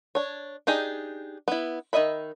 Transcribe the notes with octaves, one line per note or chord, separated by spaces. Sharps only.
D4 C#5
D4 D#4 G4 G#4
B3 E4
D#3 F3 D#5 E5 B5